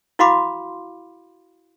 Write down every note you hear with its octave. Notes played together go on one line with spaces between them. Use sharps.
E4 F#4 F5 B5 C6 D6